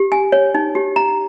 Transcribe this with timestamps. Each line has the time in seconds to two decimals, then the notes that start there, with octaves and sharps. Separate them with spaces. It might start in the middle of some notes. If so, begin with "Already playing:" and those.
Already playing: G4
0.12 G#5
0.32 C#5
0.54 D#4
0.75 G4
0.96 A#5